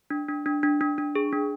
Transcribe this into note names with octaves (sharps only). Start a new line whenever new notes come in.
D4
D4
D4
D4
D4
D4
G#4
D4